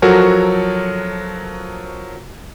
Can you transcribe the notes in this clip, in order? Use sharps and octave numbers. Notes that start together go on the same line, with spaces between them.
F3 F#3 F#4 A4 A#4 C#5